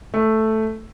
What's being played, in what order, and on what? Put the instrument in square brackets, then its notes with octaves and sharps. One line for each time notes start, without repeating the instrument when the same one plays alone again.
[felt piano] A3